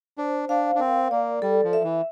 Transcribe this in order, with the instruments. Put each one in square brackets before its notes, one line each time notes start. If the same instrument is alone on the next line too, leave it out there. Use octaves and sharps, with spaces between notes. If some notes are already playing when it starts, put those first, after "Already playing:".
[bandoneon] D4 [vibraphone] C5
[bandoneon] D4 [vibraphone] F5
[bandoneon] D4
[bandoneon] C4 [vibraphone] A#4
[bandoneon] A#3 [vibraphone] D5
[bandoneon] G3 [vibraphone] A4
[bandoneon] F3
[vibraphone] E5
[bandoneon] E3